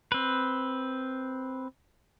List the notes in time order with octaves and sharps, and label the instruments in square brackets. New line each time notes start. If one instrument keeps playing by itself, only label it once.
[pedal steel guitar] C4 B4